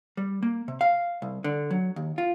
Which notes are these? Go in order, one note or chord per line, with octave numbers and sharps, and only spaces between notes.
G3
A#3
C3
F5
C2
D3
F#3
D#2
F4